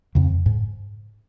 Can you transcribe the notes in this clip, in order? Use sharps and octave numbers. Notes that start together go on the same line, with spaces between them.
F2 C#3
G#2